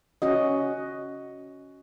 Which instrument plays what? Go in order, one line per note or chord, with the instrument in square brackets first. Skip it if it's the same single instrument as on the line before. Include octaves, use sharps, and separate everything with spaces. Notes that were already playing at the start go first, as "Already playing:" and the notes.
[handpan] C#4 F#4 D#5